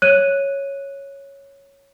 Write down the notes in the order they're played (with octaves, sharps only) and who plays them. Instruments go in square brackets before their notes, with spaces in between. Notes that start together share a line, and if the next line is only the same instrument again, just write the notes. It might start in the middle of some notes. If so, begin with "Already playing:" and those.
[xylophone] C#5 [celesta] F#6 D#7